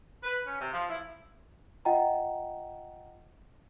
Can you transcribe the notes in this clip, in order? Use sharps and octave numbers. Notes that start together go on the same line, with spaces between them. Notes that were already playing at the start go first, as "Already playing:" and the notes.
B4
C#4
C3
F3
E4
F4 D#5 F#5 G5 A#5